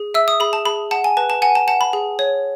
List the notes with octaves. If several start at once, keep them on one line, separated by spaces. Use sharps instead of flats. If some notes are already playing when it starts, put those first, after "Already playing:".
Already playing: G#4
E5 E6
D#6
G#4 B5
A5
G#4 B5
F#5 A5
G#5
B4 A5
A5
F#5 G#5
A5
F#5 A5
B5
G#4
C#5